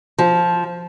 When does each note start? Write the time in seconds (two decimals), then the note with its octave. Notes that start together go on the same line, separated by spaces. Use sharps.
0.19 F3